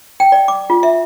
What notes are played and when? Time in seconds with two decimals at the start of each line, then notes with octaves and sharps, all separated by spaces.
0.20 G5
0.32 D5
0.48 D6
0.70 F4
0.83 E5